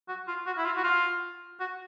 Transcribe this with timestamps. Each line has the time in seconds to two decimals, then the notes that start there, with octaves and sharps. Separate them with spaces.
0.08 F#4
0.28 F4
0.46 F#4
0.58 E4
0.65 F4
0.77 F#4
0.84 F4
1.60 F#4